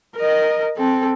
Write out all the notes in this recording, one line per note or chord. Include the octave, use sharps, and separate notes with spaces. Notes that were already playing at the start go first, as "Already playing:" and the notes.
A#4 D#5
C4 A4